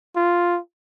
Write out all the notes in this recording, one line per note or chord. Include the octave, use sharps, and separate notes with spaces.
F4